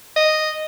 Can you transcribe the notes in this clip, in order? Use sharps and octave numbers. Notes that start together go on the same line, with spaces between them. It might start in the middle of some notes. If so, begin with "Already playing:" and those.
D#5